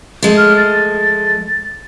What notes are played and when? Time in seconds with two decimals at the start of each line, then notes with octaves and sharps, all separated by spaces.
0.22 F3 G#3 A3
0.38 F6
0.57 A6